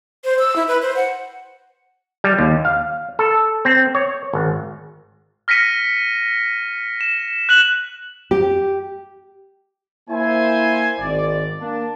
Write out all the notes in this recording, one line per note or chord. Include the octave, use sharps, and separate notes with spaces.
C5
E6
E4
B4
C5
F#5
G3
D#2
F5
A4
C4
C#5
G#1
F6 A#6 B6 C#7 D#7
E7
F#6 E7 F#7
G4
A#3 E4 C5 G#5
G#1 D5
A#3 D4